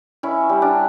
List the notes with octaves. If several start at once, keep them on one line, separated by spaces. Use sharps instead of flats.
C#4 E4
G3
D4